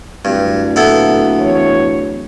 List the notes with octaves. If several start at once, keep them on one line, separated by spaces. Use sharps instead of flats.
D1 G2
A#2 B3 E4 A4
E2 C#5